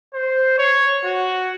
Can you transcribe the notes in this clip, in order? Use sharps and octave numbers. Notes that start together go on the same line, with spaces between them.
C5
C#5
F#4